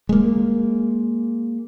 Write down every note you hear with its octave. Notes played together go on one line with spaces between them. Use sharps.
G#3 A#3